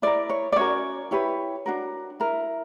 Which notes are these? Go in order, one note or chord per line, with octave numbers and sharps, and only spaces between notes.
E4 A#4 D5
C#5
D5
C#4 F#4 A#4 C#5
E4 G4 B4 C#5
D4 F#4 A#4
E4 A#4